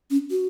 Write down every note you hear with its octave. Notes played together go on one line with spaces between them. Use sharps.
C#4
F#4